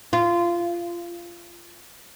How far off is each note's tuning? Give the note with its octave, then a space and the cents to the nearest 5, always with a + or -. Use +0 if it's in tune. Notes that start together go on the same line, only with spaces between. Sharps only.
F4 -20